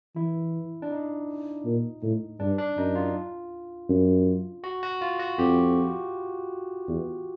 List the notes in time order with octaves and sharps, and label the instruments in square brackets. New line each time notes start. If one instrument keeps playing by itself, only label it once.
[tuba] E3 [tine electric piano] E4
[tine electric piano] D4
D#4
[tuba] A#2
A2
[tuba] G2 [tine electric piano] D4
[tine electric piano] D4
[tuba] F#2 [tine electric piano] D#4
[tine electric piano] F4
[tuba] F#2
[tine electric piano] F#4
F#4
F4
F#4
[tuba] F2 [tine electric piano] G4
[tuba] E2